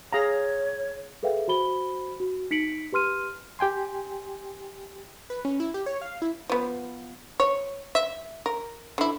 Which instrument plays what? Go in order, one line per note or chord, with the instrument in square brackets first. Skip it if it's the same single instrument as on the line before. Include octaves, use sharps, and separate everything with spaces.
[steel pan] G#4 F5 A#5 [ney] C#5
[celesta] G#4 A4 B4 E5 F5 G5
F#4 C5 B5 G7
F#4
D#4 B6 C#7 D7 F#7
G4 B4 C6 F6 D#7
[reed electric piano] G4 G5 G#5 C6
[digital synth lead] B4
C#4
E4
G4
C#5
F5
E4
[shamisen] F3 B3
C#5
E5
A#4
D3 E4